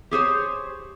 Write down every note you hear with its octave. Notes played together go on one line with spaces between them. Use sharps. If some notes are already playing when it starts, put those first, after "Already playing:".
G4 G#4 C5 C#5